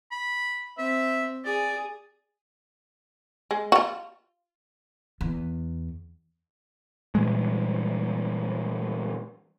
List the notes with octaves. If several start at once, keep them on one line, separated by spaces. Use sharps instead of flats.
B5
C4 E5
G#4 D5
G#3
F4 F#4
E2
A#2 E3 G3 G#3